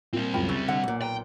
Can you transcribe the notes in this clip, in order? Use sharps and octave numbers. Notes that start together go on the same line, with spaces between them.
A#2 G3 C4
C#2 F#2 A#4 G5 B5
C#3 E6 A6
D3 D#5 F#5
B1 A#2
B4 G5 A#5